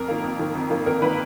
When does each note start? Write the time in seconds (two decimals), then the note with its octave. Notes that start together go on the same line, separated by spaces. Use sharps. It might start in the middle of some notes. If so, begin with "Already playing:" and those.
Already playing: F2 A#4
0.08 D#3 A#3
0.24 F2
0.39 D#3 A#3
0.55 F2
0.70 D#3 A#3
0.86 F2 A#4
1.02 D#3 A#3 B4